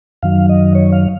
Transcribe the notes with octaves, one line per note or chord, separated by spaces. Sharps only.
F#2 D#3 F#3 F5
D#5
C#5
F5